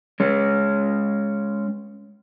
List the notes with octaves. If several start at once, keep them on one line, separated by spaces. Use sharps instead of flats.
G#3 C#4